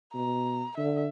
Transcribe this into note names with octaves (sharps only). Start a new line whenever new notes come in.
B2 A#5
D3 E5